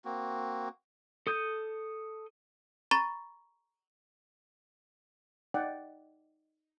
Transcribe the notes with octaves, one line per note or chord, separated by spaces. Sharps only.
A#3 C4 F#4
A4 D#6 G6
A#5 B5 C#6 A6
D#4 D5 F#5 G5